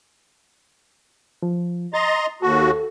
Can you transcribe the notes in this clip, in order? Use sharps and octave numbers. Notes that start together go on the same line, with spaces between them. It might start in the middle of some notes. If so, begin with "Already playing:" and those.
F3
D#5 A#5 C6 A6
D#2 F#4 A4